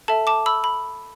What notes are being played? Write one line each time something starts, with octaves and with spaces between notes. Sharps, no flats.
A4 E5 A5
A5 D6
B5 E6
B5